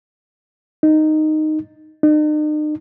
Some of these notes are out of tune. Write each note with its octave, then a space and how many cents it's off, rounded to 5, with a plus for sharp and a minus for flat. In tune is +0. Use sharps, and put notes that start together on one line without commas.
D#4 -10
D#4 -45